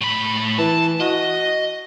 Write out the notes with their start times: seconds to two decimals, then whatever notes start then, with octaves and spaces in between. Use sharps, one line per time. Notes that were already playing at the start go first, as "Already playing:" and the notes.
0.01 A2 B5
0.58 E3 A5
1.00 F#4 D#5